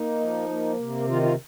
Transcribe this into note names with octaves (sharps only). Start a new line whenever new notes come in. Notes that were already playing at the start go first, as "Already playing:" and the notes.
Already playing: A#3 D#4
F3
A#3
C3
D#3 F4
F4